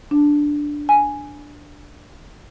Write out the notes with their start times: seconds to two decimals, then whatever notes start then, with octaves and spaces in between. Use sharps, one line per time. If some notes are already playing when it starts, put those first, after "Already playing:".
0.11 D4
0.89 G#5